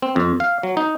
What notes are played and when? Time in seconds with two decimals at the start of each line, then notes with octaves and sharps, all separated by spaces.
0.02 C4
0.16 F2
0.40 F5
0.63 F#3
0.77 D#4